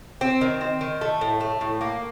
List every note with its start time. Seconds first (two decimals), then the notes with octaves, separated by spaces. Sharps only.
0.21 C4
0.41 D#3
0.61 C4
0.81 D#3
1.01 A3
1.21 A2
1.40 A3
1.61 A2
1.81 A#3